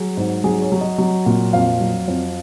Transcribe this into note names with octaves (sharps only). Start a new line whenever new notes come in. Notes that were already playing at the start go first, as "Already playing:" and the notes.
Already playing: F#3 G#4
G#2
F#3 G#4
C#5
F#3
D#5
F#3
A#2
F2 F5
F#3
F2